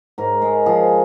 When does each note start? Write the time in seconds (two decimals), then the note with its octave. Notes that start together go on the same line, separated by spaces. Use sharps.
0.18 G#2 A#4
0.42 G#3
0.66 F3 G#4